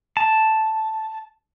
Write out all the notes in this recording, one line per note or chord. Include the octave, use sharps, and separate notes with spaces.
A5